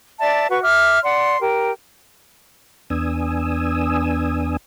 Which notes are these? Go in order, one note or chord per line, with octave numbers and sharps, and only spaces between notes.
D5 E5 A5
F#4 B4 F#5 C#6
E5 D6 F6
D5 F#5 C6
G4 A#4
E2 B3 D4 G#5 D#6 E6